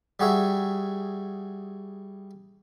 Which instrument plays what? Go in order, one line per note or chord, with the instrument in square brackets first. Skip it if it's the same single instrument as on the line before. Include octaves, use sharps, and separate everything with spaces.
[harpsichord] G3 F#4 G#4 E5